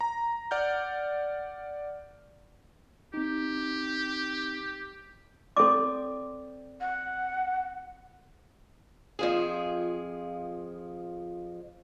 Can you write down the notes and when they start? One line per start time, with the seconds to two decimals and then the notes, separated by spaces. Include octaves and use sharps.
0.01 A#5
0.51 D5 F#5 F6 G6
3.14 C4 D#4 G4
5.57 C4 A4 D5 D6
6.81 F#5
9.19 F2 F3 G#4